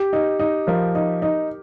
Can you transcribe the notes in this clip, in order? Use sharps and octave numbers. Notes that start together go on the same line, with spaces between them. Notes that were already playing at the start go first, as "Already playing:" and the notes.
Already playing: G4
D#4
D#4
F3 A#4
D#4
D#4